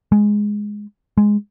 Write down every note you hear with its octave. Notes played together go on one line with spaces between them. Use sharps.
G#3
G#3